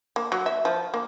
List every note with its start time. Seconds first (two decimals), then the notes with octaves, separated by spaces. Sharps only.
0.16 A#3
0.32 F#3
0.46 E5
0.65 F3
0.94 A#3